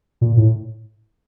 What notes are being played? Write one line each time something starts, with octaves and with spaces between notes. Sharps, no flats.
A#2
A2